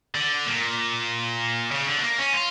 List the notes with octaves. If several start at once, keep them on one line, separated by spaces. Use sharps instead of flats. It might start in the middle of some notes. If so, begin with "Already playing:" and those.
D3
A#2
C#3
D3
A3
A#3
C#4
F4